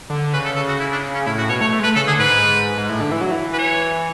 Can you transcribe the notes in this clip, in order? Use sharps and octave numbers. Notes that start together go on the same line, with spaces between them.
D3
C#3 B4
A4
A4
F#4
E4
D4
C#4
A2 E4
A2 F#4
B2 C#5
A3 C#5
A3
G#3
A3 B4
C#3 A4
D3 G#4
G#2 B4
G#2
A2
D3
E3
F#3
E3
B4
C#5